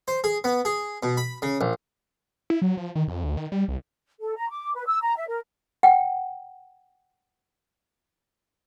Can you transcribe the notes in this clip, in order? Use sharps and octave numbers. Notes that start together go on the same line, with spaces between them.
C5
G#4
B3
G#4
B2
B5
C#3
A#1
E4
F#3
F3
D#3
F2
D2
D#3
G3
C2
A4
A#5
D6
B4
E6
A#5
E5
A#4
F#5 G5